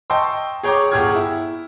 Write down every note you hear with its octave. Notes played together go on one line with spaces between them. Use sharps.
D#5 G5 A5 C6 C#6 E6
G#4 C#5 G5 A#5 C#6 D6
G1 G4 G#4 C#6 F6 G#6
E4